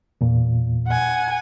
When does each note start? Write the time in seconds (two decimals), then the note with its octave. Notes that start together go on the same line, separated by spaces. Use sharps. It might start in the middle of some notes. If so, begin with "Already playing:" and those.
0.21 E2 A#2
0.87 F#5 G#5